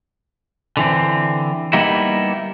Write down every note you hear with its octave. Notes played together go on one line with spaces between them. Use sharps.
D3 E3 C4
G3 A#3 B3 D#4 E4